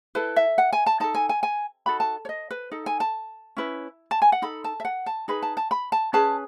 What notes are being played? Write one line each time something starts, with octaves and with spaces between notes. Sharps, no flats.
E4 A4 B4
E5
F#5
G#5
A5
D#4 A4 A5
G#5
G#5
G#5
D#4 F#4 A4 B5
A5
C#5
D#5
B4
D#4 A4
G#5
A5
C#4 E4 B4
A5
G#5
F#5
D#4 A4 B5
A5
E5
F#5
A5
D#4 G#4 B4 B5
A5
A5
B5
A5
C#4 G#4 B4 A5